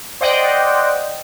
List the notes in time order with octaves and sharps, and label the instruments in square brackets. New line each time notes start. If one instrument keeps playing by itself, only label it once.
[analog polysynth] C5 D5 D#5 F#5 G5